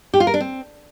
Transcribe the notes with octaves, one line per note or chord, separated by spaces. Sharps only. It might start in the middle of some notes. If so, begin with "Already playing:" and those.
G4
F4
A#4
D4
C4